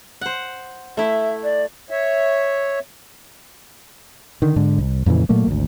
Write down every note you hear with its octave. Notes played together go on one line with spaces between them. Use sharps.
C5 F#5
A3 E4 E5
D5
C#5 E5
D3 D#3
G#2 D3
C2
F2 A#2 C#3 E3
A#2 F#3 A3 A#3
G#1 D2